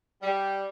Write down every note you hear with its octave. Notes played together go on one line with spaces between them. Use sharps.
G3